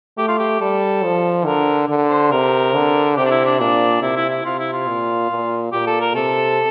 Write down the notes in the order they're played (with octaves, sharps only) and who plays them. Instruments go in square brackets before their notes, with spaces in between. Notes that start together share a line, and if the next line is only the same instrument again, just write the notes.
[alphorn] A3 [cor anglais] G4
[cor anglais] F4
G4
[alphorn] G3 [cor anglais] A4
[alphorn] F3
[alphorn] D3 [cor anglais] A#4
[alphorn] D3
[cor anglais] C5
[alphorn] C3 [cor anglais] A#4
[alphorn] D3
[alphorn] C3 [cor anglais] G4
[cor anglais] D4
E4
D4
[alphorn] A#2 [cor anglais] D4
[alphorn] C3 [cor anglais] E4
[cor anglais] E4
E4
[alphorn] C3 [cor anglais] F4
[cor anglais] E4
F4
[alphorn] A#2
A#2
[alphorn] A#2 [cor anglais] G4
[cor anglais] A4
A#4
[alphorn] C3 [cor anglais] A4